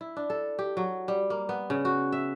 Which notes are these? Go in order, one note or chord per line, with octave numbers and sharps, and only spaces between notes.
E4
D4
A4
G4
F#3
G3
A#3
B3
C#3
F#4
E5